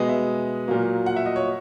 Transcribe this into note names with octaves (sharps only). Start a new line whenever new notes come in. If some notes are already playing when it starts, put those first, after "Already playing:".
Already playing: B2 G#3 B3 D#5
E5
A#2 F#3 A#3
F#5
E5
D#5
C#5